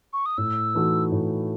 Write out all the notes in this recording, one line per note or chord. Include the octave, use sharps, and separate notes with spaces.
C#6
D#6
A2 E6
E3 A3 D#4 F#4
A2